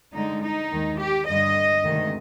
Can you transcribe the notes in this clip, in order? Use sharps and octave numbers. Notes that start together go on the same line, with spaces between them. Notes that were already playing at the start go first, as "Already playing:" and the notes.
G2 D3 G#3 D#4
D#4
D#2 D#3 G#3
G4
G2 D3 G3 D#5
D2 C3 D#3 G#3